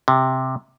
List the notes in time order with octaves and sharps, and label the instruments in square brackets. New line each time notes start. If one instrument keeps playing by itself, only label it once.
[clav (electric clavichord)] C3